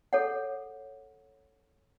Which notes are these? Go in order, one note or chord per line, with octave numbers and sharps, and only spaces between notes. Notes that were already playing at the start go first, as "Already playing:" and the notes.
G#4 A4 C#5 F#5